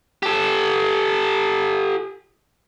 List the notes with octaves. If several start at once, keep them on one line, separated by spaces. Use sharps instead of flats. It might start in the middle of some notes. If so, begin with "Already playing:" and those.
G4 A4